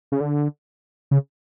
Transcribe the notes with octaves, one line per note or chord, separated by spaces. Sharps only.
C#3
D3
C#3